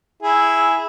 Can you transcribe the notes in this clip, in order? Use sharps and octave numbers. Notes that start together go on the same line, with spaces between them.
E4 G#4